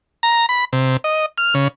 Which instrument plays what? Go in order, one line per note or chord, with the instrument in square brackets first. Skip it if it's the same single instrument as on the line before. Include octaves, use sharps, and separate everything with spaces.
[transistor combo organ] A#5
B5
C3
D#5
F6
C#3